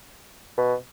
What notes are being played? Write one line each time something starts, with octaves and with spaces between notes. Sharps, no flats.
B2